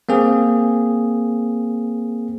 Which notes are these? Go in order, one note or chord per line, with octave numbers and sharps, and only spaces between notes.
A#3 C4 G#4